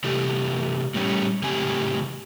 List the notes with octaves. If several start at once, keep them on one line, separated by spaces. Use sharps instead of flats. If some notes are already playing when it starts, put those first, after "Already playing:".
C3 E3 A3 G4
A2 G3 C#4
A2 C#3 C4 G4 G#5